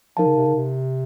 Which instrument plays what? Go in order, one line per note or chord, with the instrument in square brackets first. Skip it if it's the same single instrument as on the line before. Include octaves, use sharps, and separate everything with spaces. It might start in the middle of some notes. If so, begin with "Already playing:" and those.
[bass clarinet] F3 [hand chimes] D#4 A#4 F5 A5
[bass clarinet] C#3
C3
C#3
C3